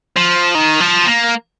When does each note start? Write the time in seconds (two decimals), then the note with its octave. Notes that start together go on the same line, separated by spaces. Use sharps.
0.16 F3
0.55 D#3
0.80 F3
1.06 A#3